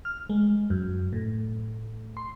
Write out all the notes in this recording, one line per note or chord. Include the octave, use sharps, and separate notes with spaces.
F6
G#3
F#2
A2
C6